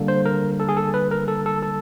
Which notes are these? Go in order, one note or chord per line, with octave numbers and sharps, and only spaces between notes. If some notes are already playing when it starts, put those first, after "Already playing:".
Already playing: D3 G3 A#3
C5
A#4
A4
G#4
A4
B4
A#4
A4
A4
A4